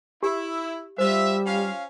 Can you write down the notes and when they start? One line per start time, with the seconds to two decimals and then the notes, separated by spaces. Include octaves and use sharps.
0.23 E4 G4
0.98 G3 F4 C5 E5
1.46 C#4 F4 F5